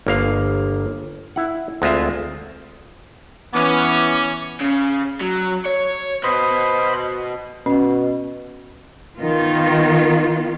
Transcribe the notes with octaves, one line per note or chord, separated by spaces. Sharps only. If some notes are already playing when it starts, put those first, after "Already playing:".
G1 A#3 F5
E4 F#5
D2 G#3 C4 F4 E5
E3 B3 C#4 D6
C#3
F#3
C#5
B2 C5 D#5 B5
B2 C#4
D#3 B3 F4